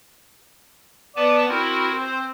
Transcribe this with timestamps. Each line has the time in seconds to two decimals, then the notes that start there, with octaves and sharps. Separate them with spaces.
1.16 B3 B4 D5 A5
1.49 C4 E4 F#4 A#4
2.00 C5